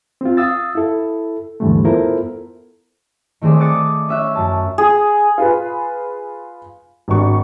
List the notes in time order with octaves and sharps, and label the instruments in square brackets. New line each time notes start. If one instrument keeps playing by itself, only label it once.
[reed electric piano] C4 F4
F5 D#6 E6 A6
E4 A4
D#2 G#2 D3 E3 G3 A3
B3 E4 F4 A4 A#4 C5
[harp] D#3 A3 C4 G#4 D5
D6 D#6 F#6 A6 C#7
C#4 E5 F#6
F#2 A5
[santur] G#4
[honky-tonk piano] F4 G#4 B4
G#1 F#3 D4 C#6